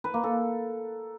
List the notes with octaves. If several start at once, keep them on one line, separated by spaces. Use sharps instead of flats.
B4
A#3
A4